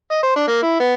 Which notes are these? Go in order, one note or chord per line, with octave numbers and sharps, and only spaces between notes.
D#5
C5
D4
A#3
E4
B3